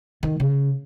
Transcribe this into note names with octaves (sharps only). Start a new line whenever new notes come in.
D#3
C#3